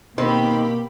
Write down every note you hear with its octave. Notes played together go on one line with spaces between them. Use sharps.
B2 D#3 A#3 C4 G4 B5 C6